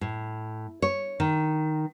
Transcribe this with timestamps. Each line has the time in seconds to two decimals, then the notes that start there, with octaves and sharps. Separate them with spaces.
0.01 A2
0.82 C#5
1.20 D#3